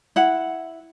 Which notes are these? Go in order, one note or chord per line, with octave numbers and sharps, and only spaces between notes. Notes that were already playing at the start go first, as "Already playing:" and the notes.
E4 F#5